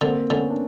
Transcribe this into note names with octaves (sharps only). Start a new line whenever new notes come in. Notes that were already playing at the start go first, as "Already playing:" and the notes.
D3 A#3 C4
D3 B3 C#4
D4